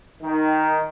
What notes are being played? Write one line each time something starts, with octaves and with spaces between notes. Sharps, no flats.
D#3